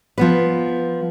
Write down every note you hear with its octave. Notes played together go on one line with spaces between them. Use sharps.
F3 B3 B4